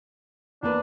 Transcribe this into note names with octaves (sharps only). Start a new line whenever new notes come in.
E2 A#3 D4 B4